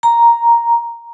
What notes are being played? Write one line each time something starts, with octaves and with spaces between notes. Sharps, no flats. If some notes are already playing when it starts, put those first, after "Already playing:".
A#5